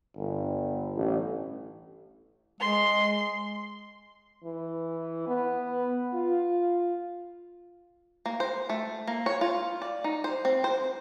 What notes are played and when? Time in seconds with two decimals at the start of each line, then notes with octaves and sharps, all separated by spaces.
0.17 G1
0.97 A1
2.60 G#3 C6
4.44 E3
5.27 B3
6.14 F4
8.26 A#3
8.40 C5
8.69 A3
9.07 A#3
9.26 C#5
9.41 F4
9.82 D5
10.04 D#4
10.24 C5
10.45 C4
10.64 C5